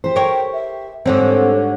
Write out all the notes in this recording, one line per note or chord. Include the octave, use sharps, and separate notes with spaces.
G4 C5
A#4 C#5 G5
E5
G#2 D3 G3 C4 A4 C#5